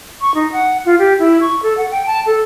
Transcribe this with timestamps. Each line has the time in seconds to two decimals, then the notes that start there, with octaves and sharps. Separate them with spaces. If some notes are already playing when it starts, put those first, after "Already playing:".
0.21 C#6
0.35 D#4
0.52 F#5
0.86 F4
0.99 G4
1.19 E4
1.41 C#6
1.63 A4
1.77 F#5
1.91 G5
2.06 A5
2.26 A4